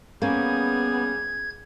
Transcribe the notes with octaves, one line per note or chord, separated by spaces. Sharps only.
G3 A#3 B3 C#4 G#4 G#6